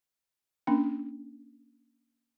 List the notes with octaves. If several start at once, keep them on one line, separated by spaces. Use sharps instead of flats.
A#3 C#4 D4